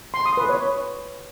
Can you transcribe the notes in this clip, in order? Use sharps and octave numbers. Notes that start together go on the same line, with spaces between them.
C6
D#6
B4
C#5